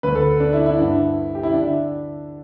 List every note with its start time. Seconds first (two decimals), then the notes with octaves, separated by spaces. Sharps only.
0.03 D2 D3 B4
0.15 A4
0.40 D4
0.53 E4
0.66 E4
0.78 G2 D3
1.35 G4
1.43 E4
1.52 D3 D4